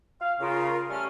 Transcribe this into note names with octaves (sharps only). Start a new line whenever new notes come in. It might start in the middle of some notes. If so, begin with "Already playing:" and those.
F5
C#3 F4 A#4
G3 A3 C#4 F6